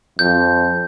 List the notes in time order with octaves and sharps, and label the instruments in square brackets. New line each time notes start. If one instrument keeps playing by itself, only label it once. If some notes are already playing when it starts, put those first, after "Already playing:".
[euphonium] F2 [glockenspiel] G6